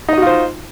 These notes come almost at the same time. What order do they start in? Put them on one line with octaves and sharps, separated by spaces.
D#4 D#5 F#4 F4 C5